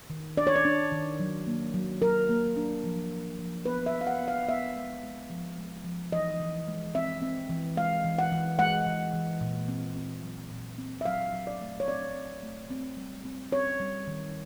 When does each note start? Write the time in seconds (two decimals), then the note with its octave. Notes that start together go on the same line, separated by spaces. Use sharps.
0.10 D#3
0.37 D4 D5
0.47 C#5
0.56 D5
0.65 D4
0.92 D#3
1.20 F#3
1.47 A#3
1.74 F#3
2.02 F#3 A#4
2.29 A#3
2.56 D4
2.84 F3
3.11 F3
3.39 F3
3.66 B3 B4
3.86 E5
3.93 F3
4.01 F5
4.07 F#5
4.21 B3
4.28 F5
4.48 B3 E5
4.76 G#3
5.03 G#3
5.30 F3
5.58 G#3
5.84 F3
6.12 E3 D#5
6.40 E3
6.68 G#3
6.95 C4 E5
7.22 C4
7.50 E3
7.77 G#3 F5
8.04 E3
8.19 F#5
8.32 E3
8.59 G#3 F#5
8.87 E3
9.14 E3
9.41 A#2
9.68 C4
9.96 C4
10.23 F#3
10.51 A#2
10.78 C4
11.01 E5
11.05 F#3 F5
11.33 F#3
11.47 D5
11.61 A3
11.80 C#5
11.87 C4 D5
12.15 C4
12.43 A3
12.70 C4
12.97 G3
13.25 C4
13.52 C4 C#5
13.80 G3
14.07 D#3